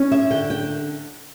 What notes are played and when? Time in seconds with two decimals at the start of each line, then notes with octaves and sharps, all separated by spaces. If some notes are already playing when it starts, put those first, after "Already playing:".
Already playing: C#4
0.11 E5
0.30 D3 G5
0.50 G5